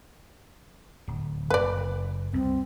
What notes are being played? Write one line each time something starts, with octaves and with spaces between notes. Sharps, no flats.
D1
F#1 B4 D5
C2 C4